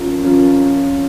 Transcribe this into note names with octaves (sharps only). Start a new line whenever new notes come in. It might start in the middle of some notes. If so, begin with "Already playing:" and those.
Already playing: F3 A#3 C#4 F4
F3 A#3 C#4 F4